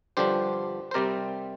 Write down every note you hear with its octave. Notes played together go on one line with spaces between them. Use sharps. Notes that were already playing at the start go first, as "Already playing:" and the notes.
G2 D3 F3 D4 G4 C5
C5
C3 G3 C4 A#4 D5